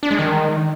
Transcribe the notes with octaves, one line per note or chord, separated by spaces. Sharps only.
D4
G#3
D#3